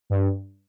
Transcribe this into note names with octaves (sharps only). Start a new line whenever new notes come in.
G2